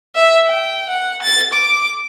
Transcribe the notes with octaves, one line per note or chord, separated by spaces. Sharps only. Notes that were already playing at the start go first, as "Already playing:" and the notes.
E5
G5
F#5
A6
D6